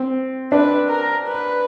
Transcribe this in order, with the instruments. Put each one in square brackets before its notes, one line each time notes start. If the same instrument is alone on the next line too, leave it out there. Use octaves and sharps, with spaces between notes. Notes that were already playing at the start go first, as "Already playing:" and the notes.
Already playing: [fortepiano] C4
[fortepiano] D4 [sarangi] B4
[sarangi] A#4
B4